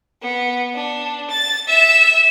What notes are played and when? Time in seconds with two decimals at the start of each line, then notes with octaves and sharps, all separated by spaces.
0.22 B3
0.75 D4
1.30 A6
1.68 E5 E7